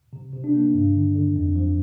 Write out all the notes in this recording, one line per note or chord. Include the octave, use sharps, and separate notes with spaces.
C3
C3
D4
A#3
G2
D3
D3
F2
F3